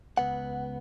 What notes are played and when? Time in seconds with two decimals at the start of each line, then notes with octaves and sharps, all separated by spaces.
0.17 C#2 B3 F#5